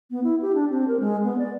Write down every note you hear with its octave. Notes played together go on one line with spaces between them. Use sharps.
B3
E4
G4
D4
C4
A#4
G#3
B3
D5